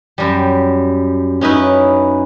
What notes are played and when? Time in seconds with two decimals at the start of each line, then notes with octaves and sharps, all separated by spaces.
0.18 F#2 G3
1.41 C#4 D#4 E4 B4